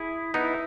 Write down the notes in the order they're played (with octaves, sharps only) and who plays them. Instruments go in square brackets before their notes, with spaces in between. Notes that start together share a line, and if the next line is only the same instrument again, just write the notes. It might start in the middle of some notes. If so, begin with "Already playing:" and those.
Already playing: [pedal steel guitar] E4 G#4
[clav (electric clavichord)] B3 D#4 [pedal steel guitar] E4